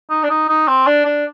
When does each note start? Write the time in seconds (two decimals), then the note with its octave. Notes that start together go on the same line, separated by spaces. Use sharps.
0.10 D#4
0.23 D4
0.30 D#4
0.49 D#4
0.68 C4
0.87 D4
1.05 D4